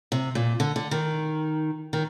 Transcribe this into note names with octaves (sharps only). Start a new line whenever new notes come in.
C3
A#2
D3
D3
D#3
D#3